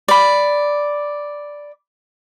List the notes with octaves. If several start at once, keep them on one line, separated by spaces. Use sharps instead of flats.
D5 B5